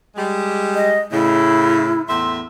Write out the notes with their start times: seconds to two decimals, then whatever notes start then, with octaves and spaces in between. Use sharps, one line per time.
0.16 G3 G#3
0.74 D#5
1.11 A2 C#3 E4
2.08 E2 A2 E5 C6